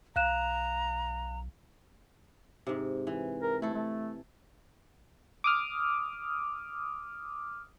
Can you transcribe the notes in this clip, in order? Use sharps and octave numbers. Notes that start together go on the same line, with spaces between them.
B1 F5 A#5 F#6 E7
G#2 C3
E3
A#4
A3 E4 A4
A3
D6 D#6 F6